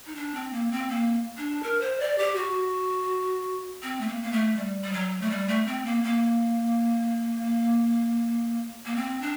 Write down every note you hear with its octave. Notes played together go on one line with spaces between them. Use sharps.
D#4
D4
C4
A#3
C4
A#3
D4
A#4
C5
D5
G4
F#4
C4
A3
A#3
A#3
A3
G3
G3
F#3
A3
G3
A3
C4
A#3
A#3
A#3
C4
D4